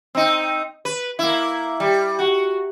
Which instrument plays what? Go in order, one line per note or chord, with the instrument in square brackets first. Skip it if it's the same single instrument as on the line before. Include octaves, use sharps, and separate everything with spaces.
[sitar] C4 D#4
B4
A#3 E4
G3
F#4